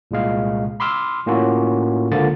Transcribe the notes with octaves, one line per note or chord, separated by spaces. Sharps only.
C2 A#2 G#3 F5
B5 C6 D6 E6 F6
A2 A#3 C#4 F4 F#4
C#2 D3 F3 A#3 A6